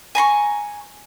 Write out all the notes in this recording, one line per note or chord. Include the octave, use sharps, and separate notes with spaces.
G#5 A#5 C6 C#6